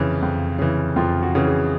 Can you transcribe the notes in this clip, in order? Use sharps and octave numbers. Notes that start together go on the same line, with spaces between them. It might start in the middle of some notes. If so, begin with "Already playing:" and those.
Already playing: F2 C#3 E3
F2
C#3 E3
F2 F4
F#4
C#3 E3
G#4